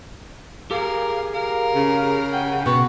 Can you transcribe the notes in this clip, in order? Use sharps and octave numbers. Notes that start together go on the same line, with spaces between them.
G4 G#4 A#4 F5
A#4 F5
C#3
F#5 G5
B2 B3 F#4 C#6